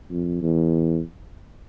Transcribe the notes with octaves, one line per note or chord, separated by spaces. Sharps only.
F2
E2